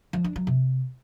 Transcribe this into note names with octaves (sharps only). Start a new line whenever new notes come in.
F3
D4
F#3
C3